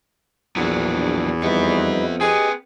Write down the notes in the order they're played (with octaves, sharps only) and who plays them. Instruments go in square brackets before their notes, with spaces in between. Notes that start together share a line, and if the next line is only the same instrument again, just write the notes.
[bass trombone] A#1 [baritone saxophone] E2 [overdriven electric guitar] F#3 D4
[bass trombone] F2 [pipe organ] G3 D#4 B4 [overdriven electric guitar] B3 E5
[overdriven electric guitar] C4 B4 [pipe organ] G4 D#5 [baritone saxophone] G#4